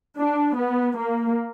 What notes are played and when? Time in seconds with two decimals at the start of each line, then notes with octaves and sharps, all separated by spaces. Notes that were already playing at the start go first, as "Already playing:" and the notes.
0.17 D4
0.56 B3
0.96 A#3